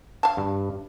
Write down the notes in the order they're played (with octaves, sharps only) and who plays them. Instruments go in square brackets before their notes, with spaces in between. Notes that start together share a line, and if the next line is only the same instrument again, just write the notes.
[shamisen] F5 A5
[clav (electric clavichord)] G2